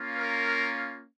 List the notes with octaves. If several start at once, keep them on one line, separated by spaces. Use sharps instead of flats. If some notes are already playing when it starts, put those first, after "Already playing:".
Already playing: A#3 C#4 F4
A#4